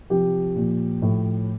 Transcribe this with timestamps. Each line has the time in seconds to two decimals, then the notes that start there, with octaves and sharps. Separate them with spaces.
0.10 C3 F3 G4
0.56 A#2 F3
1.02 A2 F3